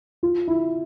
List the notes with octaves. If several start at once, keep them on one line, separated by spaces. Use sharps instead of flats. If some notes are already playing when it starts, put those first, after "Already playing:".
F4
E4